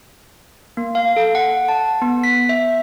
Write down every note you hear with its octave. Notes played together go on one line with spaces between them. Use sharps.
A#3
F5
A4
F#5
A5
B3
B6
E5